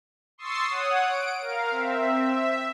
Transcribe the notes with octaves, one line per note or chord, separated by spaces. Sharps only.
C6 C#6 D#6 E6 A6 C7
C#5 F#5 D#6
D7
A#4 F5
C4 E5
E5